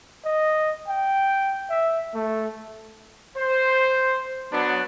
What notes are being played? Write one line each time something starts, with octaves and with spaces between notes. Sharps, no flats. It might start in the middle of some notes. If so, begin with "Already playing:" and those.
D#5
G5
E5
A3
C5
F#3 B3 D4